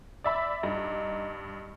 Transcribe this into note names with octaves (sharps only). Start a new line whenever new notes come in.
D5 E5 B5
G2 D#4